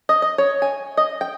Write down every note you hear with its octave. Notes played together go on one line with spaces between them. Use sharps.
D#5
D#5
C#5
G#5
D#5
G5